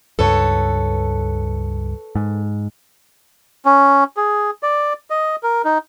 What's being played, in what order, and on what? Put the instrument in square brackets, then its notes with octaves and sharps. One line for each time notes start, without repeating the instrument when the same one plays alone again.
[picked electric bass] C#2 G2 [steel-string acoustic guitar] A4 B4 C#5
[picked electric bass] G#2
[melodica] C#4
G#4
D5
D#5
A#4
D#4